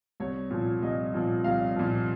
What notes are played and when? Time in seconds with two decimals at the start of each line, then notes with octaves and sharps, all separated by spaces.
0.20 C2 C#5
0.51 A#2 F3
0.82 C2 D#5
1.14 A#2 F3
1.44 C2 F5
1.76 A#2 F3